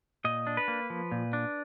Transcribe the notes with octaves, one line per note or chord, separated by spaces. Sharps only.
A#2 D#5
D4
B4
A#3
F3
A#2
D4